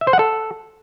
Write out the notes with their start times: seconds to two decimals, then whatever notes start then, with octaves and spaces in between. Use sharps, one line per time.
0.01 E5
0.07 C5
0.13 F#5
0.19 A4